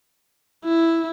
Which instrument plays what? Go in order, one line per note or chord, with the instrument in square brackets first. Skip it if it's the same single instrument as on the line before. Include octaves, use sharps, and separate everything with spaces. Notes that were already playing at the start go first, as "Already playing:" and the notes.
[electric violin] E4